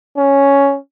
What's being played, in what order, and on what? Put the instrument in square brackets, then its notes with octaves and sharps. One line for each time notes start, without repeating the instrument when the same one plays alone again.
[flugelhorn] C#4